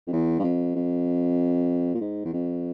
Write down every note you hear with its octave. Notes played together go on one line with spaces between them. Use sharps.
F2
E2
G2
F2
F2
A#2
G#2
E2
F2